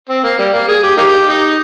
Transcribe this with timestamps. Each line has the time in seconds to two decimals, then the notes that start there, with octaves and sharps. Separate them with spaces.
0.09 C4
0.24 A#3
0.38 G3
0.53 A#3
0.68 G#4
0.83 G4
0.97 A#3 D#4 G4
1.28 D#4